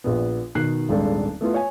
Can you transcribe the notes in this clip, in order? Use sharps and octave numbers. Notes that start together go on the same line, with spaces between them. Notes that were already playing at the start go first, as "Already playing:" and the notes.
A#1 A#2 B3
B2 D#3 F#6 C7
D#1 G#1 G#3 D4 A4
A3 B3 E4 F4
C#5 G#5